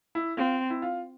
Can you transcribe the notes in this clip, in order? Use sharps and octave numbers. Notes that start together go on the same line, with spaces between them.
E4
C4 F4
E4
F4